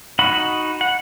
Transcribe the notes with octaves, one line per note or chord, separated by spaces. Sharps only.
D#4 F#4 F#5 B5
F#5